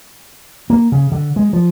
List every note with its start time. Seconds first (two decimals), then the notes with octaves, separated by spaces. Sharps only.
0.70 A#3
0.92 C#3
1.12 D3
1.36 G#3
1.53 F3